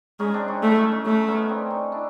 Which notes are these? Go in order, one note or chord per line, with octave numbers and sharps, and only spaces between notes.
G#3 C#4 D#4
C4 D4
C#4 D#4
A3 E4
C#4 D#4
C#4 D#4
A3 C#4 D#4
B3 C#4
C4 D4
C#4 D#4
D4 E4